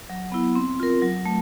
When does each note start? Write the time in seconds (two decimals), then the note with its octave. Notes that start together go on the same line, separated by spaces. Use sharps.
0.10 F#3
0.32 B3 E4
0.55 C4
0.80 F4 A#4
1.02 F#3
1.26 A3